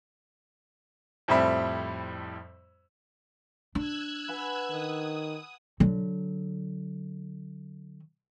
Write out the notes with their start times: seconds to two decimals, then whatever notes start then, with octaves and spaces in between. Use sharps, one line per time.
1.28 F2 A2 G3 C4 E5 B5
3.75 D4 E6 F#6 G#6
4.28 B4 F#5 G#5
4.70 D#3 D#6
5.80 D3 F#3